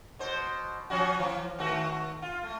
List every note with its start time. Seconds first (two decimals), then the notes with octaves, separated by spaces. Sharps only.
0.19 B2 C5
0.90 F3 C#4 F#4
1.19 E3
1.59 D#3 A3 F#4
2.22 F4
2.43 A3